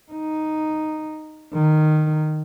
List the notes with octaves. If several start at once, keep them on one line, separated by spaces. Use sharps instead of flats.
D#4
D#3